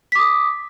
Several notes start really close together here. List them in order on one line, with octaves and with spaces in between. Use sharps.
B6 D6 D#6